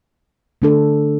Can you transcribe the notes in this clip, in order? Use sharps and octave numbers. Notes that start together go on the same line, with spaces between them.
D3 A3 D4 A4